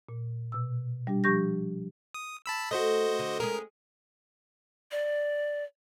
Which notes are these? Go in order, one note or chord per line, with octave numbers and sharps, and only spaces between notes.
A#2
B2 E6
G3 D4 G4
F3 D4 G4 C#6 G6 A#6
D#6
A5 B5 E6
A3 F#4 C5 D#5
D3
G#3 C#4 G#4 A#4
D5